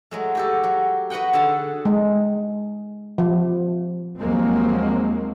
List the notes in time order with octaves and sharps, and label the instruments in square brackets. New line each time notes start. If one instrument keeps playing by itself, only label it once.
[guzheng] F#3 G#3 A3
F#4 G4 A4
F#3
F#4 B4 D#5 F#5 G5
D3 G#4 A4 A5
[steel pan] G#3
F3
[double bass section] D#2 F3 F#3 G#3 A#3 C4